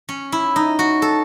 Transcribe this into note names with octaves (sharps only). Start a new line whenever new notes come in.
C#4
E4
D#4
F#4
A4